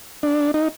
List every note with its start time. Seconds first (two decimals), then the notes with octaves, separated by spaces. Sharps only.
0.23 D4
0.54 D#4